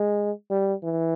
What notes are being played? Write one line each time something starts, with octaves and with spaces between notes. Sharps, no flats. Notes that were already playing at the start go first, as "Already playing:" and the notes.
Already playing: G#3
G3
E3